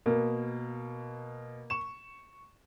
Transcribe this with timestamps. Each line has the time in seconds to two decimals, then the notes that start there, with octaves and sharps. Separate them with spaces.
0.06 B2 A#3
1.70 C#6 E7